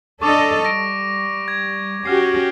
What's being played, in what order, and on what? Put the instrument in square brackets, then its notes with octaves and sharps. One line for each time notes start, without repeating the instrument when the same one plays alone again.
[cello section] D4 A4 D#5 [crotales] C#6 D6 F7
[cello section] G3 [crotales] A#6 D7
[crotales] G#6
[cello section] C#4 F#4 G4 [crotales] F6 C7